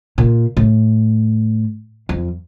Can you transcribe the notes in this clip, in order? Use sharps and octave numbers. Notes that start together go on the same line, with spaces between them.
A#2
A2
F2